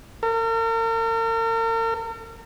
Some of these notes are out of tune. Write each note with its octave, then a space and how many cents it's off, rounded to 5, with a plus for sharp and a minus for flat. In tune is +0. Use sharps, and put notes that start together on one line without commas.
A#4 -40